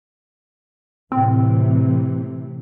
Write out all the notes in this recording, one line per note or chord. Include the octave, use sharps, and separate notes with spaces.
A2 C3 E3 C4